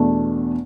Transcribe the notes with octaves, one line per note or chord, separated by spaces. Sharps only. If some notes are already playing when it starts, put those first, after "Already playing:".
Already playing: E2 B2 A3 D4